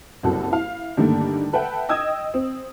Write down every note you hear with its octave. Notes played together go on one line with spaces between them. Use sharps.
F#1 C2 F#3 F#4 A4
E4 F5
G2 D3 D#3 A3 A#3
A4 B4 E5 F#5 G5
D#5 G5 D#6 E6 G#6
C4